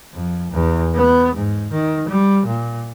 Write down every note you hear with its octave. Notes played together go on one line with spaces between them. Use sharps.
F2
E2
B3
G#2
D#3
G3
A#2